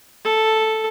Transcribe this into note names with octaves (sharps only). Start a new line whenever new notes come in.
A4